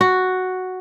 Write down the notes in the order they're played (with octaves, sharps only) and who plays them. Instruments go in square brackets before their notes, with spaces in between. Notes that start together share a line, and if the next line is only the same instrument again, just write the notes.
[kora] F#4